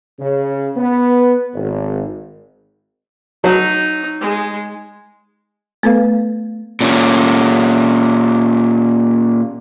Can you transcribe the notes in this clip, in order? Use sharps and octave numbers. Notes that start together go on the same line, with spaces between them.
C#3
B3
G#1
F#3 D#4
G#3
A3 B3 A4 B4 F5
A#2 C#4